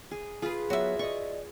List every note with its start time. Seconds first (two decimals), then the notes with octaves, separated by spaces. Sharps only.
0.11 G#4
0.42 F4 G#4 B4
0.70 F#3 B3 F#4 E5
0.99 D5 D#5 C#6